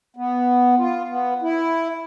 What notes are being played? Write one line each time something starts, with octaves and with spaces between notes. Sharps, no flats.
B3
F4
B3
E4